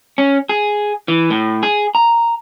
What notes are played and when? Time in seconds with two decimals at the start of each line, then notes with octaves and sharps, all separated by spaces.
0.18 C#4
0.49 G#4
1.08 E3
1.30 A2
1.63 G#4
1.95 A#5